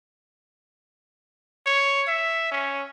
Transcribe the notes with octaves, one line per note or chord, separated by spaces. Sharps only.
C#5
E5
C#4